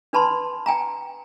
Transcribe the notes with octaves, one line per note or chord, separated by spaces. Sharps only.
D4 B4 A5 B5 C6
G5 G#5 A#5